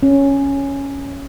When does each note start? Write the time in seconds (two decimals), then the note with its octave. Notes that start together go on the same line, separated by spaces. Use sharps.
0.03 C#4